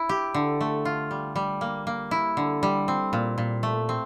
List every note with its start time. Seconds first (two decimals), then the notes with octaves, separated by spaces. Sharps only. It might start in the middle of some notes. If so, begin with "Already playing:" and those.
Already playing: E4
0.09 G4
0.34 D3
0.61 A3
0.85 F4
1.11 G3
1.36 G3
1.61 A#3
1.87 A#3
2.11 E4
2.37 D3
2.63 G3
2.88 C4
3.13 A#2
3.38 A#2
3.63 A3
3.89 C4